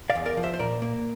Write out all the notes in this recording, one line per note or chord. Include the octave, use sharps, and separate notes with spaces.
D5 F5
E2
A#4 D5
F3
C5 E5
C5
A#2 A#4 D5
A#3